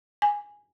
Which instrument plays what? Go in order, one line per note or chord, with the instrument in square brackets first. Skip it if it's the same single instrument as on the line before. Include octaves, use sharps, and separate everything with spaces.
[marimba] G#5